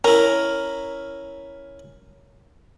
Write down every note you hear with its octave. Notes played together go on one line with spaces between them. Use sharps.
C#4 E4 A#4